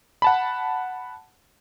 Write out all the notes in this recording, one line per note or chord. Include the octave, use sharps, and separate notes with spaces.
F#5 A5 B5